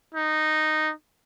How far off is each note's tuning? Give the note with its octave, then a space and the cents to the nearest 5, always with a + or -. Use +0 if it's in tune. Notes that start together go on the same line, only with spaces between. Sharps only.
D#4 -10